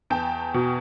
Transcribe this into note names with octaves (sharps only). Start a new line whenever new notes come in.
E2 G5 A5
B2